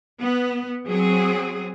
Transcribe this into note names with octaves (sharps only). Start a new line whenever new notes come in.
B3
F#3 C4 G#4